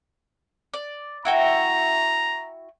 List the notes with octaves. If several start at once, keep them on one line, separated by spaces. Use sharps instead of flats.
D5
E4 F#4 G5 A#5